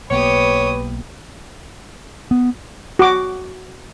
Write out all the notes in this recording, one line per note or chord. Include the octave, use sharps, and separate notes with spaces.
B1 A#3 B3 G4 B4 C#5 D#6
B3
F#4 D6